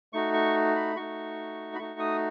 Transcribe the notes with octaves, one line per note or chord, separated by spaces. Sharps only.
A3 D#4 F#4 C#6
C#6
B5
A3 D#4 F#4 C#6
B5
A3 D#4 F#4 C#6
D#6